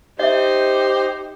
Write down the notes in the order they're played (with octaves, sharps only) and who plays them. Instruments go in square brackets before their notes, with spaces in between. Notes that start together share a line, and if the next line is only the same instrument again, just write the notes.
[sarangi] D#4 [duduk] G4 [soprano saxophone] C5 [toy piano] D#5 E5